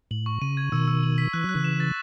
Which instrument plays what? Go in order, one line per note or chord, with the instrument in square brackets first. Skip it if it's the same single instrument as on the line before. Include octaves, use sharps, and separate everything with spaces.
[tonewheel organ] A2 [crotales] F#7
[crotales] C#6
[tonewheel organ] C#3 [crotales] D#7
[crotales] G#6
[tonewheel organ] B2 D#3 [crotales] E6
[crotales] E6
F#7
B6
[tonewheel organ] E3 [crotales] F#6
[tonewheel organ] F#3
[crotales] F#6
[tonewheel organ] C#3 E3
[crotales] E7
A6